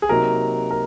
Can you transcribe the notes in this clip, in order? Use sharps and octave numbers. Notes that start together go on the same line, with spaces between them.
G#4
C3 F#3 A#3 D#4 A#4
A#4